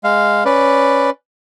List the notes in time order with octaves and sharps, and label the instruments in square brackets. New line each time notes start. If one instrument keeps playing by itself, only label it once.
[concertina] G#3 F5
C#4 B4 D5